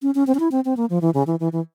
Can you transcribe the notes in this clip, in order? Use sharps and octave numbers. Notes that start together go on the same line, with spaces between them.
C#4
C#4
C4
C#4
E4
C4
C4
A#3
F3
E3
C#3
E3
E3
E3